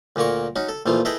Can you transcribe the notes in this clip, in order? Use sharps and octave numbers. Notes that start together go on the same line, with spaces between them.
D2 A#2 A#3 A#4 C#6
C#4 D#4 F#4
A4
A#1 E3 F3 A3 F4
E4 G#4 A4 B4 D#5 G5